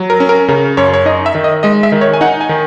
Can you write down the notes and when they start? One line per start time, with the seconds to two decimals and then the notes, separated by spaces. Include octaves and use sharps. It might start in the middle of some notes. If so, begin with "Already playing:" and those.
Already playing: F#3
0.10 A#4
0.20 C#4
0.29 A#4
0.48 C#3 A#4
0.77 F#2 C#5
0.94 C#5
1.05 D#4 D#5
1.26 E5
1.35 D#3
1.44 D#5
1.63 G#3 D#5
1.83 E5
1.92 D#3
2.01 C#5
2.14 G#5
2.21 D#4 F#5
2.41 G#5
2.49 D#3